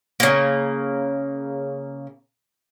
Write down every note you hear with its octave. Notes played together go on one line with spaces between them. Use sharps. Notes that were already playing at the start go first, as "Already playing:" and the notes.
C#3 A#3